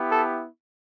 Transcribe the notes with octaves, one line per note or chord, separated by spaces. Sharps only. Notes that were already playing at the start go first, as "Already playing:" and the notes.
Already playing: B3 E4 G4
A4